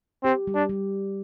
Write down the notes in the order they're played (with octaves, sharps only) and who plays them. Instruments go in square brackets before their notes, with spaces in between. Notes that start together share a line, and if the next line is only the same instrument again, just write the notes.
[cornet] C4 [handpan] G4
[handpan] G3
[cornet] D4
[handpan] G3